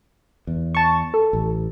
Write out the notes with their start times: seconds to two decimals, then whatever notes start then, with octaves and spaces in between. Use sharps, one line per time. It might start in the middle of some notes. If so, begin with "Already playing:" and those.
0.47 E2
0.75 A5 C#6
1.14 A4
1.33 A1